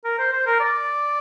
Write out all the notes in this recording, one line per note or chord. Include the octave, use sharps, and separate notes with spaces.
A#4
C5
C5
A#4
D5